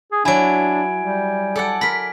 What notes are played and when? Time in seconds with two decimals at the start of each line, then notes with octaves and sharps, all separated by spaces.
0.12 G#4
0.25 F#3 D4 E4 G#5 G#6 D7
0.99 G3
1.56 A4 D5 F#5
1.81 A#4 B5 B6